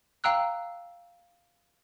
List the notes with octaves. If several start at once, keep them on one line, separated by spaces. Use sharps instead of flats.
F5 G5 A#5 E6 F#6